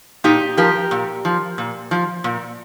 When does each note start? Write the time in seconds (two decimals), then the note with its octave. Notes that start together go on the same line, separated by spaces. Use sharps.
0.24 A#2 D#4 G4
0.57 F3 G4 A#4
0.91 A#2
1.25 F3
1.58 A#2
1.91 F3
2.24 A#2